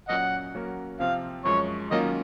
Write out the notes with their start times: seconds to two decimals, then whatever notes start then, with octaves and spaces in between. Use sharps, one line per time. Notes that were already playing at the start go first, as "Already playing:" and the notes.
0.09 A#2 F#3 C#4 D#5 F#5
0.54 F#3 A#3 C#4 F#4 A#4
1.00 C3 F3 C4 F5
1.45 F#2 F3 G#3 C#5
1.91 D#3 F#3 A#3 C#4 F4 D#5